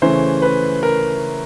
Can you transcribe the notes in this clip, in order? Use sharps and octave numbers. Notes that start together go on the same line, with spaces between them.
C#3 E3 A3 C#4 C5
B4
A#4